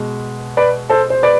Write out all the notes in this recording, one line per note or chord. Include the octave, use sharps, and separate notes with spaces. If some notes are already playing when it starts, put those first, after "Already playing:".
Already playing: B2 G#3
B4 D5
A4 C5
C5
B4 D5